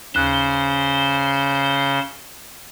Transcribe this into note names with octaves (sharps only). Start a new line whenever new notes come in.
D#2 C#3 C5 F#6